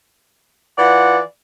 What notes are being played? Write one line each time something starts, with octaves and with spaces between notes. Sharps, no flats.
E3 F4 D5 F#5